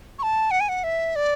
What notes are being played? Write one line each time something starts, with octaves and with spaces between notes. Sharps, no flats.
C#6
A5
F#5
G#5
F#5
E5
D5